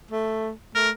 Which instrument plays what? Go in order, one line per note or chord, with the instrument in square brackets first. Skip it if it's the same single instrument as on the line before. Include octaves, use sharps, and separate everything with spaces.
[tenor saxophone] A3
[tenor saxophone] A3 [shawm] A#4